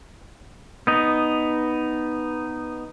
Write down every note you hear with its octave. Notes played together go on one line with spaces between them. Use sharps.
B3 D#4